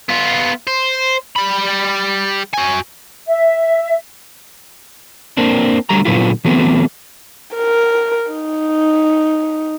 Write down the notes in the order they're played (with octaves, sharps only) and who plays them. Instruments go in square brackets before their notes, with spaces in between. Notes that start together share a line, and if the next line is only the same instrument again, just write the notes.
[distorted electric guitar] B3 F4
C5
G3 B5
F#4 G#5
[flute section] E5
[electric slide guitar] A#3 C4 D4
D3 F#3 G3 A3 A#5
A#2 D3 F#3 B3 E4 F4
E3 F#3 A3 B3 C4
[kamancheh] A#4
D#4